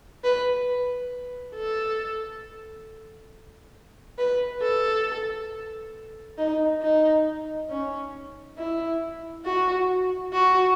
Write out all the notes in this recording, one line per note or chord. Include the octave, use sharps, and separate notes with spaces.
B4
A4
B4
A4
D#4
D#4
C#4
E4
F#4
F#4